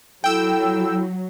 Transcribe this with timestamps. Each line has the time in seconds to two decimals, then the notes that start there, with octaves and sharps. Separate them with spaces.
0.24 F#3 E4 A4 G5 E6